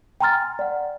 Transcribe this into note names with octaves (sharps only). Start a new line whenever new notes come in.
G5 G#5 A#5 C6 F6 A6
D5 F#5